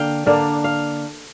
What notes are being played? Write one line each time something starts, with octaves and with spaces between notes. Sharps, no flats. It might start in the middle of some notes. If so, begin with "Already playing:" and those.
Already playing: D3 A#3 D4 F5 G5
D3 A#3 D4 F5
F5